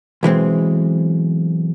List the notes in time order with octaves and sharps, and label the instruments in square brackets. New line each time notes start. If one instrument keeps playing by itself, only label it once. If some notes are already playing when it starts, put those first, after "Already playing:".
[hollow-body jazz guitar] B1 E3 G#3 C4